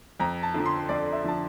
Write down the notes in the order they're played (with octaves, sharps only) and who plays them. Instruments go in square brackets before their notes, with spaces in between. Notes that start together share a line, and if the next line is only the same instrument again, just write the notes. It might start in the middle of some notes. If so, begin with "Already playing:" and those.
[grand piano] F2 A#5
A5
D3 F3
C6
F2 D5
E5
D3 F3 A5